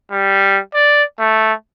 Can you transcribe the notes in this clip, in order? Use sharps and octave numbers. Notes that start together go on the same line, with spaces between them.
G3
D5
A3